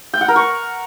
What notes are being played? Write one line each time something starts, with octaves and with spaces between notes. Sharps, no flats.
G5
F#5
A#4
C#6